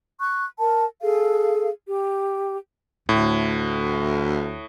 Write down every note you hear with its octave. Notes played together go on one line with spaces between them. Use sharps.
C#6 F#6
A#4 A5
G#4 A4 F5
G4
D2 A2